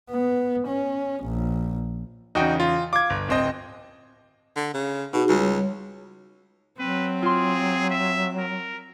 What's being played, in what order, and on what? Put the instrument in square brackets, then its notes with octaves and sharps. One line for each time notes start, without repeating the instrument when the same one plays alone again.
[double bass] B3
C#4
A#1
[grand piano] E2 C#3 [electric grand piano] D#4 F#4 G5
[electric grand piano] F4
[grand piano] F4 [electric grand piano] D6 G#6
[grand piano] G1
D1 C4 D#5
[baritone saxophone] D3
C#3
[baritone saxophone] B2 [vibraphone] D#4 F#4 G#4
[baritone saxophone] C#2 [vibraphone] G3 C#5
[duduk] F#3 [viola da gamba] C4 [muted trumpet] B4
[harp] F4 C6 [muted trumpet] G#4
[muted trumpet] E5
A#4